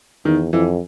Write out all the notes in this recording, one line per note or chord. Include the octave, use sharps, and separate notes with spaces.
E2 D#3
F2 E3